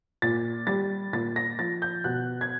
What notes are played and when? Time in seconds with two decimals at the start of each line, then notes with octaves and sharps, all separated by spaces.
0.22 A#2 A6
0.67 G3 A6
1.13 A#2 A6
1.36 A#6
1.59 F3 A6
1.82 G6
2.04 B2 F#6
2.41 G#6